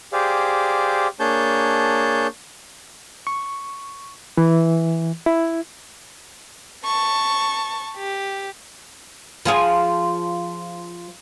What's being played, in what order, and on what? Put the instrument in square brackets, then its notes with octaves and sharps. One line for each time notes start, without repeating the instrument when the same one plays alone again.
[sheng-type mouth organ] G4 G#4 C5 D5 F5
A#3 D4 G#4 C#5 A5 G6
[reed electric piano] C#6
E3
E4
[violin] A5 C#6
G4
[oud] F3 F4 G#4